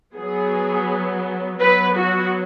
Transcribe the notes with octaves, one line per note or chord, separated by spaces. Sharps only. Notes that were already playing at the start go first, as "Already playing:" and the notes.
F#3 B3 G#4
F#3 B3 B4
F#4